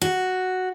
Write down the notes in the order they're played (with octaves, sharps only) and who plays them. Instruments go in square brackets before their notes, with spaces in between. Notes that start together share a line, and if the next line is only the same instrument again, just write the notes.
[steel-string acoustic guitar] F#4